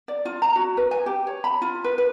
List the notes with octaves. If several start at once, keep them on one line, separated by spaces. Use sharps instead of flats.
D5
F4
A#5
F#4
B4
G#5
G4
C#5
B5
F4
B4
B4